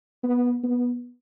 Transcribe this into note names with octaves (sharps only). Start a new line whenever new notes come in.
B3
B3